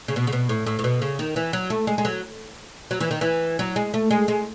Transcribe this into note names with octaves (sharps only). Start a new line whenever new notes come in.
C#3
B2
C#3
B2
A2
A2
A2
B2
C#3
D#3
E3
F#3
A3
G#3
G#3
F#3
F#3
E3
D#3
E3
F#3
G#3
A3
G#3
G#3